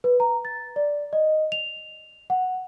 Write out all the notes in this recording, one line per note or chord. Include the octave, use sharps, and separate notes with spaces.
B4
A#5
A6
D5
D#5
F7
F#5